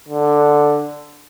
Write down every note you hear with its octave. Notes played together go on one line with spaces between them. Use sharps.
D3